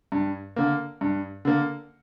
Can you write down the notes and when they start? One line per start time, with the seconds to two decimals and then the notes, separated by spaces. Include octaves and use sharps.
0.12 G2
0.56 D3 A#3
1.01 G2
1.45 D3 A#3